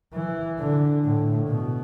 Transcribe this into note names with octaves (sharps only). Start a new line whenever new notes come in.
E3
D3
A2
B2